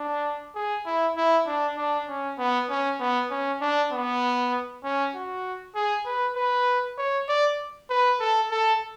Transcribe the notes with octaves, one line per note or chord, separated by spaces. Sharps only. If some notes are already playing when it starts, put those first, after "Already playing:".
Already playing: D4
G#4
E4
E4
D4
D4
C#4
B3
C#4
B3
C#4
D4
B3
C#4
F#4
G#4
B4
B4
C#5
D5
B4
A4
A4